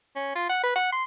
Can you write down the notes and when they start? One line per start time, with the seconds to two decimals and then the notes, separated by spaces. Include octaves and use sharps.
0.16 C#4
0.36 F4
0.49 F#5
0.63 B4
0.76 F#5
0.92 C6